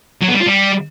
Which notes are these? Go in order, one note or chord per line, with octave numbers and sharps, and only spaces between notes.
F#3
B3
G3
F4
G3